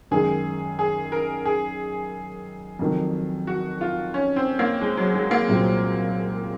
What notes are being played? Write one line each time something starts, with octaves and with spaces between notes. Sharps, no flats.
F#2 D#3 G#3 G#4
G#4
A#4
G#4
F2 D#3 F#3
F#4
F4
C#4
C4
A#3
G#3
F#3
G#3
A#3
C2 A#2 F#3 C4